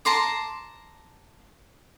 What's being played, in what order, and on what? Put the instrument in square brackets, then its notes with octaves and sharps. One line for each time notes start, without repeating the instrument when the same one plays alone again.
[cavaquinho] A5 A#5 C6 D6